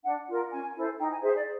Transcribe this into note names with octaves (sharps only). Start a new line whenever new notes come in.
D4 F#5
F4 A#4
C#4 G#5
E4 A4 C5
D#4 G5
G#5
G#4 C5 E5
D5